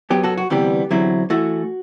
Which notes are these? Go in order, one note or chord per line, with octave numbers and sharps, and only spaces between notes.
F#2 F#3 B3 G4
F#4 A4
F#4
D2 C3 E3 G3 B3 G4
E2 D3 F#3 C4 E4
E3 A3 E4 F#4